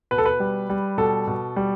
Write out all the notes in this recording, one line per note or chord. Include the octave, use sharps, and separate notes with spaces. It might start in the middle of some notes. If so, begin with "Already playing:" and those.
B2 B4
A4
B4
G3
G3
B2 A4
B2
G3